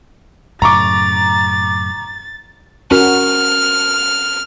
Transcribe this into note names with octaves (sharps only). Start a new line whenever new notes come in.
F#2 A2 C#3 A#5 C#6 D6 A6
C#4 F#4 A#4 F6